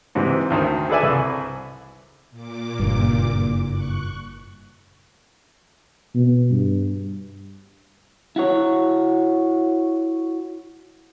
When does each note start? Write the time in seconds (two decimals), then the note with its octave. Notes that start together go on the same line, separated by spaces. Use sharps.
0.15 G#2 C3 E3
0.50 D2 D#3 C5
0.89 G#4 A4 B4 D5 E5 G#5
1.03 C2
2.31 A#2 D6
2.79 F#1 G2
3.72 C#6 F#6
6.15 B2
6.51 G2
8.36 E4 F#4 C#5